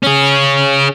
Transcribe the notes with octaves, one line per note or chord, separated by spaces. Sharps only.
C#4 G#4